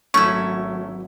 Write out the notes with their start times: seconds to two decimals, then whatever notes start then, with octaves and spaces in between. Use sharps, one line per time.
0.14 G#1 F#3 A3 C#4 E4 C#6